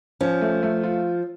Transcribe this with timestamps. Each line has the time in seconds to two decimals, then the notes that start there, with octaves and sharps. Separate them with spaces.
0.21 F3 C#4
0.41 A3
0.63 A3
0.83 F4